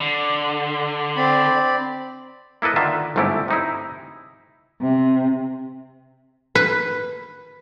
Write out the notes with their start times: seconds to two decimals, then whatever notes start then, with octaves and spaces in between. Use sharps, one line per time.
0.01 D3
1.16 C4 D5 B5
2.62 A#3 E4 A4 B4 D#5
2.76 D3 D#3 F4 E5 A5
3.16 G1 G#2 C3 A3 E4 G4
3.48 C3 D#4 E4
4.81 C3
6.55 B4